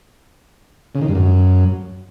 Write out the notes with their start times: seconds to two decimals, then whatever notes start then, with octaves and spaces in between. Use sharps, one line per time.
0.95 C#3
1.02 D#3
1.08 G2
1.15 F#2